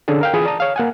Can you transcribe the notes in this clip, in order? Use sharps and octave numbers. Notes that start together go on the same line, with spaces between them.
D3 C#4 D4 G#4 A4
A#4 F5 G5
E3 F4 G#4 B5 D#6
D5 A5 A#5 D#6
C#5 F5
A#3 F#5 G#5